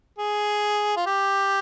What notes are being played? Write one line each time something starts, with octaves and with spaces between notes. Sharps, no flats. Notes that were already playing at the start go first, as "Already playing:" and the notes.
G#4
F4
G4